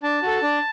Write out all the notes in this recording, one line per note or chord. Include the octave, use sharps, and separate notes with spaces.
D4 A5
F#4 A4
D4